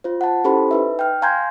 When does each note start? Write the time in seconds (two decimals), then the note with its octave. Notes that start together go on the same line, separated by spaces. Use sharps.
0.04 F4 C5
0.21 F#5 A5
0.44 C#4 E4 G4 A4 C5 B5
0.71 D#4 B4 E5
0.99 G5 F6
1.22 F5 G#5 A#5 C6 G6 G#6